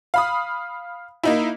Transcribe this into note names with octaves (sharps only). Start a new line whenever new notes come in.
F5 B5 D#6
A#3 D#4 E4